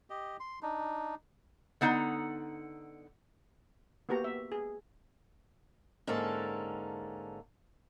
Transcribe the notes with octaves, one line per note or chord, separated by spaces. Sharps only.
G4 D#5
C6
D4 D#4
D3 B3 D#4 F#5 A#5
A#3 B3 F#4 G4 A#5
E5
G#4
G#2 D3 A#3 C#4 A4 A5